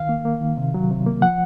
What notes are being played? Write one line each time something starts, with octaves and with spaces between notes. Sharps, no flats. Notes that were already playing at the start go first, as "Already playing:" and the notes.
Already playing: D#3 F5
A#3
A#3
D#3
C3
F#3
C3
A#3
F3 F#5